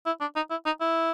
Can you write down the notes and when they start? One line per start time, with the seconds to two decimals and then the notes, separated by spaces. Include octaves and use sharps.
0.06 E4
0.21 D4
0.36 D#4
0.50 E4
0.66 D#4
0.81 E4